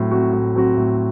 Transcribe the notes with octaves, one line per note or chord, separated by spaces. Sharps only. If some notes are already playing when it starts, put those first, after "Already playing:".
Already playing: A2 F#3 C4 F#4
F#3 C4 F#4
A2
F#3 C4 F#4
A2